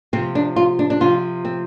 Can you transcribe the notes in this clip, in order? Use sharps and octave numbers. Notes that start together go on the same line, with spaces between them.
C3 F3 C4
D4
F4
D4
D4
C3 F3 F4
C4